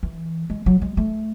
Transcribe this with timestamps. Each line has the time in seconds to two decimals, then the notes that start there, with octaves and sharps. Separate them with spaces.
0.03 E3
0.50 G#3
0.66 F#3
0.82 G#3
0.97 A3